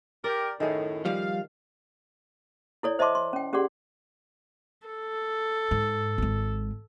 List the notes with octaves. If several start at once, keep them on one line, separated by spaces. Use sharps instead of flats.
G4 A#4 D5
F#2 A2 D#3 A3 G#4
F3 G3 F5
E4 A4 C#5 D5
C5 D#5 E5 A5 C6 D6
C6
C#4 G5
C#4 G4 G#4 D5 F#5 C6
A4
G#2
G#1 G#3